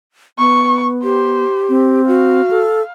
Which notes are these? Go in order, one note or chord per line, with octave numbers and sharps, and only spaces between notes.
B3 C#6
G4 C5
C4
F#4 F5
A4